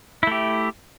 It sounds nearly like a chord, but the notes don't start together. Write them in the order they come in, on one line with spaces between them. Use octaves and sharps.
E4 A3 G4